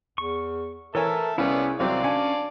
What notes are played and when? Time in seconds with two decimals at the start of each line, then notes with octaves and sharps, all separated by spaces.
0.18 E2 C#6
0.95 E3 A4 A#4 C#5 E5 G#5 A5
1.38 C2 B3 C#4 E4 G#4 C#5 D5 F5
1.80 C2 F#3 C4 D5 F5 D6
2.04 C#4 D4 G#5